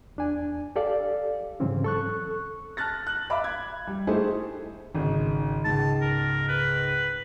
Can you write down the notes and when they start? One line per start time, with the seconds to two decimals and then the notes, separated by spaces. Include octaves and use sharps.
0.16 E2 D4 G#5
0.76 G4 A4 D5 F5
1.60 G#2 C#3 E3 F#3 C4 C#4
1.84 A4 C#6 F#6
2.77 A5 F6 F#6 A6 A#6
3.07 F#6 F#7
3.30 E5 F5 B5 D6
3.44 G#6
3.87 G3
4.07 A3 D#4 E4 G4 G#4 C5
4.95 G#1 C#3
5.65 C#2 G#2 A5
6.02 A#4
6.49 B4